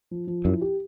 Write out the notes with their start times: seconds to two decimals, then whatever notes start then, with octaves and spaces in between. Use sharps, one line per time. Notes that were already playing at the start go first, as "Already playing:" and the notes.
0.11 F3
0.27 F3
0.45 F#2 E4
0.61 G4